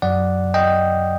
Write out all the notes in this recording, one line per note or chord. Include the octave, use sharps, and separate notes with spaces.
F#2 F#3 D5 F#5
D#5 G5